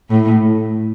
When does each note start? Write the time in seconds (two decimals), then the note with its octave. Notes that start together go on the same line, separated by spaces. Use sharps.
0.10 A2